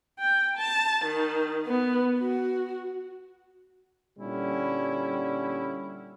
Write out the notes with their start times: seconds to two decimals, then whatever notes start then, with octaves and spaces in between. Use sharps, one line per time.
0.19 G5
0.57 A5
1.05 D#3
1.66 B3
2.19 F#4
4.18 A#2 D3 G3 C#4 E4